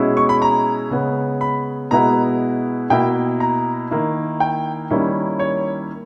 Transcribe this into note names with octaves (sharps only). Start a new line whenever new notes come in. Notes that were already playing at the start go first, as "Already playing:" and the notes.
Already playing: B2 G#3 C#4 E4
C#6
B5
A#5
C#3 G#3 B3
B5
B2 G#3 B3 E4 A#5
B2 A#3 E4 G5
A#5
D#3 A#3 E4
G5
D#3 G3 A#3 C#4 E4
C#5